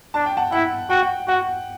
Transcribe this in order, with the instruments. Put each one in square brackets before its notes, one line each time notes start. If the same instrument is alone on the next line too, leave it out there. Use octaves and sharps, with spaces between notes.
[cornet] D4 [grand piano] A5
[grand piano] G5
F#5 A5
[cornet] E4 [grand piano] F#5
[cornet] F#4 [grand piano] G5
[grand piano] F#5
[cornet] F#4 [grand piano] F#5